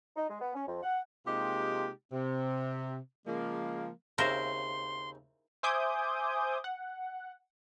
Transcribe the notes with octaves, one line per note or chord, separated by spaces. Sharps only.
D#4
G#3
B3
C#4
F2
F#5
C3 G#3 A#3 D#4 F4 G4
C3
C#3 F3 G#3 A#3
D#2 C#3 C4 E4 A#4 C5 C6
C5 E5 G#5 D6 D#6 G6
F#5